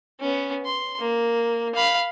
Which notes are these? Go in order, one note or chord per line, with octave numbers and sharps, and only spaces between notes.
B3 C#4
C6
A#3
F5 B5